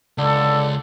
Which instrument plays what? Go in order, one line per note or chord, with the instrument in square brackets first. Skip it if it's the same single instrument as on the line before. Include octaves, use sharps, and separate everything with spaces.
[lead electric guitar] C#2 [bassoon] D3 [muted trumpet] A4